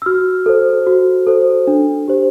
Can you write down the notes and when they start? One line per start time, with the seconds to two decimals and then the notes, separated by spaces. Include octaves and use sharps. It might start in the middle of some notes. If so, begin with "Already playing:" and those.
0.02 E6
0.06 F#4 F6
0.46 A4 C5
0.87 F#4
1.27 A4 C5
1.67 D4
2.08 G4 C5